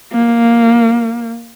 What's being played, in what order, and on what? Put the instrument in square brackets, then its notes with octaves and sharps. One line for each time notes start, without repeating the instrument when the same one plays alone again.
[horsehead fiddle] A#3